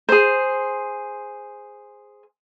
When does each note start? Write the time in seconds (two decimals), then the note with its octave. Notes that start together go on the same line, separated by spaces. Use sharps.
0.09 G#4 C5